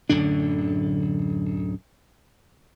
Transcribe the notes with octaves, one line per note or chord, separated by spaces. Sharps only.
D1 F#2 D3 D4